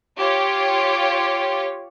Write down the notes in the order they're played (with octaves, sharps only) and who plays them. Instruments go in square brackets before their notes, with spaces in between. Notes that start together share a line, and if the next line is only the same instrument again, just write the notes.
[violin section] F4 G4 C#5